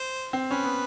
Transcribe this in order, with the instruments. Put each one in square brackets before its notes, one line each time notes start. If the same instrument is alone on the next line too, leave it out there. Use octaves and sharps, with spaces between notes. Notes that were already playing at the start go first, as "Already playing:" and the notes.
Already playing: [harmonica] C5
[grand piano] C4
[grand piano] C#4 [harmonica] B4
[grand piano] B3